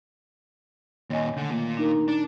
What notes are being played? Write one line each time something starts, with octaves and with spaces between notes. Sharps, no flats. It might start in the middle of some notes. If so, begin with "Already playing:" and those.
D#2 A#2 C#5 D#5 G#5
D3 D#3 A3 A4
A#2
D4 D#4 A#4
A#2 D4